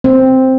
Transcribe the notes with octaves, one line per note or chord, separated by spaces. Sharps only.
C4